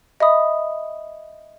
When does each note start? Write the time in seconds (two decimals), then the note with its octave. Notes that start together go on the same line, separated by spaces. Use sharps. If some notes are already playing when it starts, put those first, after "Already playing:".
0.20 D#5 E5 B5 D#6